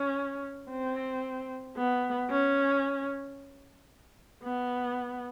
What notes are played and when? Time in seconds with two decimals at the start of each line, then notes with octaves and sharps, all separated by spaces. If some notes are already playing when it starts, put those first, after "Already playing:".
Already playing: C#4
0.70 C4
1.77 B3
2.30 C#4
4.43 B3